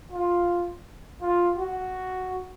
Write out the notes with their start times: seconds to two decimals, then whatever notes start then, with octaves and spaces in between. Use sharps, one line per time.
0.12 F4
1.21 F4
1.57 F#4